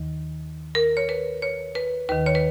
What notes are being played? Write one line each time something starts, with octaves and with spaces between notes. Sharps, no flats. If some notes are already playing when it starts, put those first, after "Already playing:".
Already playing: D#2 D#3
A#4
C#5
B4
C#5
B4
D#2 D#3 B4
C#5
B4